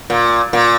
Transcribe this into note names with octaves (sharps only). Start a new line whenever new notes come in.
A#2
A#2